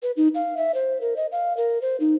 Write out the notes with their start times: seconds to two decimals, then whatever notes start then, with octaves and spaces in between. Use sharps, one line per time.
0.03 B4
0.17 D#4
0.35 F5
0.57 E5
0.74 C5
1.01 A#4
1.16 D#5
1.32 F5
1.57 A#4
1.82 C5
2.00 D#4